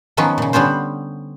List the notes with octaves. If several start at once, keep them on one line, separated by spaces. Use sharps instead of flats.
D#3 F3 F#3 B3 C#4
A#2 C#3
D3 G3 B3 C#4 C5